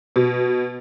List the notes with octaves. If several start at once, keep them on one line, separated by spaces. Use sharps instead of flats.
B2